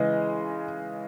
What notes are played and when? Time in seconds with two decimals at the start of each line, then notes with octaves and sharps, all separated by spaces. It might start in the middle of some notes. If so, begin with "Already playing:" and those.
Already playing: C#3 E3 G#3 D#5